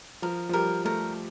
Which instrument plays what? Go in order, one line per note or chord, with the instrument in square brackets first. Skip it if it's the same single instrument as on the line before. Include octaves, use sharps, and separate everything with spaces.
[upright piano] F3 [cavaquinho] A#4
[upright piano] F3
[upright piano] G3 [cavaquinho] A#4
[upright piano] A3 [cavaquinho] A#4